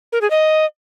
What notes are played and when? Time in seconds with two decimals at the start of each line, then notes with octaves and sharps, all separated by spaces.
0.12 A#4
0.21 G#4
0.30 D#5